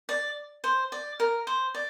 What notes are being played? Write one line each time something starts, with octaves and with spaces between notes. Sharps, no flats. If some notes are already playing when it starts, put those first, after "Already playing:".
D5
C5
D5
A#4
C5
D5